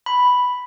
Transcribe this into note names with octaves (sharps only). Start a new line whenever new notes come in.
B5